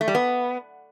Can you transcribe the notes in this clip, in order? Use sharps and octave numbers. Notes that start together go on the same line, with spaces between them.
A3
G3
B3